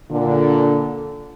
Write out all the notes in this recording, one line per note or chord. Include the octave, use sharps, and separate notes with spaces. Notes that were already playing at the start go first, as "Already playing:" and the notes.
A#2 D3